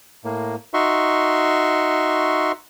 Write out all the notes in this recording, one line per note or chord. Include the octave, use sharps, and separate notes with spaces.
A2 A#3
D#4 F#4 E5 C6 C#6